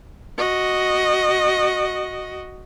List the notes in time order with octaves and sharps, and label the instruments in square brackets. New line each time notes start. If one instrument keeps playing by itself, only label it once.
[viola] F#4 D#5